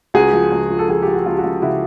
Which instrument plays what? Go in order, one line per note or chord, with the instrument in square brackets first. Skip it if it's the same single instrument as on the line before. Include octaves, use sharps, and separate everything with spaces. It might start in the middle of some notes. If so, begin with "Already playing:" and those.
[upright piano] C#2 F#4 G#4
F3
C#2
F3
A4
F3 G#4
G4
F3
F#4
C#2 F4
F#4
C#2 F4
C#3 E4 F#4